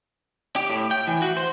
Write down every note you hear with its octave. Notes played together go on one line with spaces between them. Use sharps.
G4
A2
G5
E3
F#4
C5